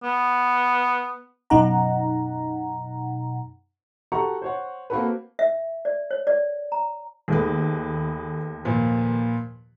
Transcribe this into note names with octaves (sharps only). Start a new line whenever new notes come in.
B3
F#2 B2 D#4 F#5 A#5
F#4 G4 A4 F#5 A#5 C#6
C5 C#5 F#5
A#3 C4 F#4 A4 B4
E5
D5
C#5
D5
A#5
D#2 A3 G#4 B4
A#2 F3 B4